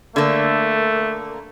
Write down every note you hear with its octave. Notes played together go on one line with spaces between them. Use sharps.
D3 A3 A#3